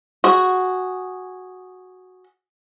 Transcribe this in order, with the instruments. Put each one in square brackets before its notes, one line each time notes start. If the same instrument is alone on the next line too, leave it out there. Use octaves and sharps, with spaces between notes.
[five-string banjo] F#4 G#4